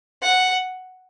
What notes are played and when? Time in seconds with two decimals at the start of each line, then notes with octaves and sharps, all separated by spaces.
0.23 F#5